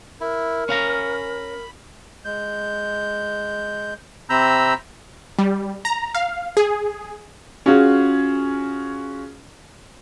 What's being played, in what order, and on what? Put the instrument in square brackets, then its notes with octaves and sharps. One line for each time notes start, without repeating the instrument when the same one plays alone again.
[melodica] E4 [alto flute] A#4
[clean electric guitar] C#4 F5 A#5 [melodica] B5
[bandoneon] G#3 G6
C3 C4 A#5 B5 E6 G6
[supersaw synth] G3
A#5
F5
G#4
[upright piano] C#4 F4 F#4 G#4